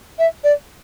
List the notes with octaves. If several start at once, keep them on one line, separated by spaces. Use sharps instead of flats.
E5
D5